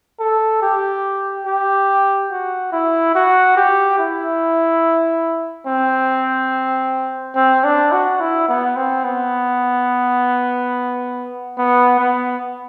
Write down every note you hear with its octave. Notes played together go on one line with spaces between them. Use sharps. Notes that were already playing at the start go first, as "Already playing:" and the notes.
A4
G4
G4
F#4
E4
F#4
G4
E4
C4
C4
D4
F#4
E4
B3
C4
B3
B3
B3